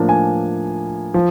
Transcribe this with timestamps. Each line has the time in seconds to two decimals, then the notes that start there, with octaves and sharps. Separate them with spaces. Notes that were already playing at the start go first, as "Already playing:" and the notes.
Already playing: A2 F3 A#3 D4
0.09 G#5
1.14 F3